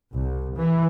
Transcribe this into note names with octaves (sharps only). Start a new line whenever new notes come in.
C2
E3